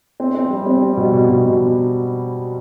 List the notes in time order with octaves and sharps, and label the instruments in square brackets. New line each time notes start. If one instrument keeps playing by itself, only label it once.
[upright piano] C4
C4
G3
C4
G3
B2
B2
B2
B2